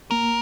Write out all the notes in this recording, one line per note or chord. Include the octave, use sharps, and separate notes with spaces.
A#3 A#4